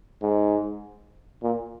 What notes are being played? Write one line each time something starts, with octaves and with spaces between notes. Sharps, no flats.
G#2
A#2